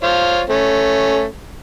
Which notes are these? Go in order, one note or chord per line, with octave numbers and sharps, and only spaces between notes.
F4 C5 C#5
A3 C#4